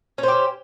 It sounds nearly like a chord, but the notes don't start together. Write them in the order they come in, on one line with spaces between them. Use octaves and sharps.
C#4 C5 G4